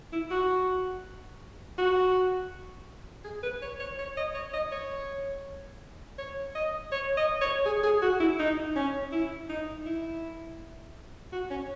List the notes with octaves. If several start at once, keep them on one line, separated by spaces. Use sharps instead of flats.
E4
F#4
F#4
G#4
B4
C#5
C#5
C#5
D#5
C#5
D#5
C#5
C#5
D#5
C#5
D#5
C#5
G#4
G#4
F#4
E4
D#4
C#4
E4
D#4
E4
F#4
C#4